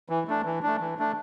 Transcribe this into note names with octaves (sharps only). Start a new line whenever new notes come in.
E3
A3 D4
E3
A3 D4
E3
A3 D4